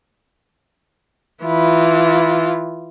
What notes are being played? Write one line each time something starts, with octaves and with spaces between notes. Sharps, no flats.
E3 F4